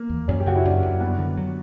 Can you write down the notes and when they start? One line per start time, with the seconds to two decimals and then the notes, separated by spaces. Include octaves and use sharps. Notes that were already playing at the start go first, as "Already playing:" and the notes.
Already playing: A#3
0.10 E2
0.28 F#2 C#4
0.40 G4
0.46 C#3 F#4
0.56 E4
0.65 F#2 D4
0.83 F#2
1.00 G2 B3
1.19 D3
1.38 F#3